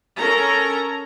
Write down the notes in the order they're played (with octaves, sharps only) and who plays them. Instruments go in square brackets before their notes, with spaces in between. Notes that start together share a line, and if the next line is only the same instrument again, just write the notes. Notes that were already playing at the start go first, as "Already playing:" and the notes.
[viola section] C#4 A4 A#4 A#5